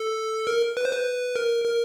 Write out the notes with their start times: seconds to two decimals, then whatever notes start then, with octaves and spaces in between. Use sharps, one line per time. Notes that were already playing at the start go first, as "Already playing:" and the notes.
Already playing: A4
0.47 A#4
0.77 B4
0.85 C5
0.93 B4
1.36 A#4
1.64 A#4